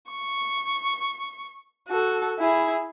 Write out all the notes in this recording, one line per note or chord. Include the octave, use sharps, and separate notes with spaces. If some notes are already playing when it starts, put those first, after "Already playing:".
C#6
F#4 A4
E4 G#4